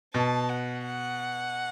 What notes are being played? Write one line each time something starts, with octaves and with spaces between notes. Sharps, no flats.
B2 A5
F#5
F#5